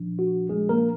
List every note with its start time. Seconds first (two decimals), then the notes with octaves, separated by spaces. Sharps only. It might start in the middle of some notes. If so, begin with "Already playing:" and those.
Already playing: A#2 F3 D4
0.19 F#4
0.49 G#3 G#4
0.69 A#3 A#4